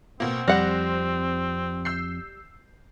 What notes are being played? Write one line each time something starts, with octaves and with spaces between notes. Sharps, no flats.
B2 A#3 C4
F2 G3 C5 F#5 F#6 A#6
E6 G6 C7